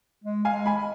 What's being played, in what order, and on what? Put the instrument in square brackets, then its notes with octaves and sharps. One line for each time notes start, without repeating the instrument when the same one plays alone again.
[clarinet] G#3
[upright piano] F5 G#5
[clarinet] G#3
[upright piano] G#5 B5